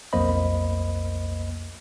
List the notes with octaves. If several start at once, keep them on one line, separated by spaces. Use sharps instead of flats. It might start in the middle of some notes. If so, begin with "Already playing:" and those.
B1 F2 A#3 C5 D#5 B5